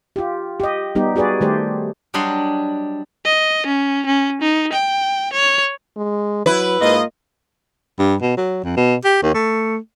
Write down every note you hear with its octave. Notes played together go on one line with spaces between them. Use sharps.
F4 G4
G4 D#5
G3 B3 D#4 G4
F#4 G#4 B4 D5
D#3 G3 A3 G4 C5 D5
F#3 G3 D4 D#5 F#5 C6
D#5
C#4
C#4
D#4
G5
C#5
G#3
F#3 E4 B4
G#2 A#3 F4 D#5
G2
B2
F#3
F2
B2
G4
D#2
A3